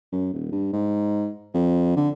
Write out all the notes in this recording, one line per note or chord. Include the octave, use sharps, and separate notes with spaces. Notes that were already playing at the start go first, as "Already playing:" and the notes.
F#2
D#1
G2
G#2
F2
D3